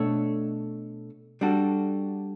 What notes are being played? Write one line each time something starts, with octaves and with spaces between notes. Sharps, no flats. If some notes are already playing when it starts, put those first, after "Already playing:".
Already playing: B2 A3 D4 A4 C#5
G3 D4 F#4 A4